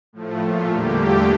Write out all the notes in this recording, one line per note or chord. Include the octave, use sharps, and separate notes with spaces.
A2 F3 A3
A#2 A3 F4
E2 D3 G3 A#3 G4
E2 D3 A3 G4